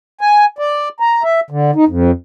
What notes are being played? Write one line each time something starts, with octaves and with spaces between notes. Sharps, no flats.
G#5
D5
A#5
E5
D3
D#4
F2